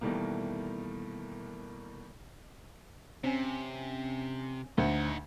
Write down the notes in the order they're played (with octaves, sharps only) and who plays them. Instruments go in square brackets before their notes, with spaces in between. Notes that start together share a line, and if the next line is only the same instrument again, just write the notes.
[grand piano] B2 D#3 E3 G3 A3 A#3
[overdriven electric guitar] C3 [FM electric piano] C4 C#4 G#5
[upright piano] D2 [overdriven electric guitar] D#4 F#5